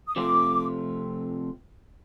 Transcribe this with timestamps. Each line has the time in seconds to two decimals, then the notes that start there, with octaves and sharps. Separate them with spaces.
0.07 D#6
0.16 C3 F3 A3 C4 F4 D6